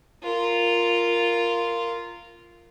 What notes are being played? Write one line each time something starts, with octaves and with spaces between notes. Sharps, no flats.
F4 A#4